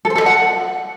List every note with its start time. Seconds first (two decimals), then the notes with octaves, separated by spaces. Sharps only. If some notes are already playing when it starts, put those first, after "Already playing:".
0.05 A4
0.10 C5
0.15 A4
0.21 D#5
0.26 F#5